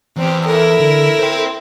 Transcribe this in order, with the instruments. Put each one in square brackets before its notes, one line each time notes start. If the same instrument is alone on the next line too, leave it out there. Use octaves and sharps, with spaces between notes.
[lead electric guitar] E2 [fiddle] C4 G4
[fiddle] E4 A#4 [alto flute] A4
[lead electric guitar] D3
C5 G5